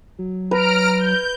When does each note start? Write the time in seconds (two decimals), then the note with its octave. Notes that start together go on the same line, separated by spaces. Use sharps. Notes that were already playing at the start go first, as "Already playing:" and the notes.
0.19 F#3
0.51 B4 A#5 F6 D7
0.99 G6